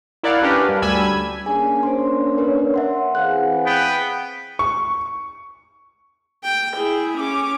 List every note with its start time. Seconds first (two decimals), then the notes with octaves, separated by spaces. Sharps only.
0.23 E4 A#4 D5 F5 F#5
0.42 C#4 D4 G4 A#4 B4
0.68 G2
0.82 D2 G3 G#5 B5 E6 G#6
1.02 G#6
1.46 A#3 C#4 D4 G#4 G#5
1.83 C5 C6
2.38 A#4 B4 C#5
2.74 E5 F#5 C6
3.15 E3 C4 G#4 F5 F#5 F#6
3.66 B3 G5
4.59 C#6
6.43 G5
6.76 E4 G#4
7.18 C#4 D6